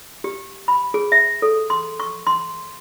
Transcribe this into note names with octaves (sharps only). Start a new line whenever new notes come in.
G4
B5
G#4
E5
A4
C6
C#6
C6